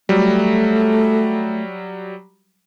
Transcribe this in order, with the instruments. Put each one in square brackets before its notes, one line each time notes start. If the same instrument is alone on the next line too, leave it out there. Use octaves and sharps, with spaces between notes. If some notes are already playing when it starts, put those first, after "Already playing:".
[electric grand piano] F#3 G3 [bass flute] A3